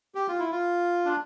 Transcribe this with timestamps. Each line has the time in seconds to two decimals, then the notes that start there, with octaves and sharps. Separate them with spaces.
0.15 G4
0.28 F4
0.39 E4
0.52 F4
1.05 D4